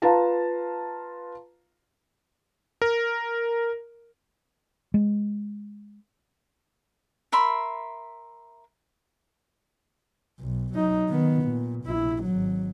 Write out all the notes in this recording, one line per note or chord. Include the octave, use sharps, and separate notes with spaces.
F4 B4 F5 A5 A#5
A#4
G#3
A#4 E5 B5 C6
B1
F#3 D#4
D#3 B3
A#2
A#1 E4
G#1 F#3